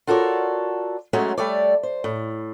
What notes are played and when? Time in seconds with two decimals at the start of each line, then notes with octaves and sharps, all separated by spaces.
0.07 F4 F#4 A4 A#4 C#5 D5
1.13 F#3 G#3 A3 C#4 F#4
1.37 G3 A3 A4 C#5 D5
1.83 C5
2.04 A2